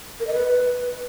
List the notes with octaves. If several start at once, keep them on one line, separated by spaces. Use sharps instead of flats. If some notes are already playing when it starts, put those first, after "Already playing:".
A#4
D#5
B4